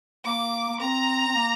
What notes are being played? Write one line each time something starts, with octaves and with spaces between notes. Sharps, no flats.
A#3 D6
A#3
C4 A#5
C4
A#3